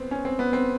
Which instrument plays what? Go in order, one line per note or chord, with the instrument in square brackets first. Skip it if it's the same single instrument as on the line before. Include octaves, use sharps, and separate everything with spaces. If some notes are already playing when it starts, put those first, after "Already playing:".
Already playing: [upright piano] B3 C4
C#4
C4
B3
C4